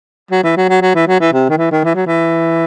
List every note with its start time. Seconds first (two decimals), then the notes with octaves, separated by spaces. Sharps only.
0.31 F#3
0.43 E3
0.56 F#3
0.69 F#3
0.81 F#3
0.95 E3
1.07 F#3
1.20 E3
1.33 C3
1.49 D#3
1.58 E3
1.71 D#3
1.84 E3
1.95 F#3
2.06 E3